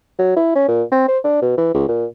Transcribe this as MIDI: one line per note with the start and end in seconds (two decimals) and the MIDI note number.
0.19 0.35 54
0.37 0.55 64
0.56 0.65 61
0.68 0.83 46
0.92 1.04 60
1.08 1.19 72
1.24 1.38 62
1.42 1.53 47
1.58 1.72 52
1.75 1.88 37
1.89 2.05 46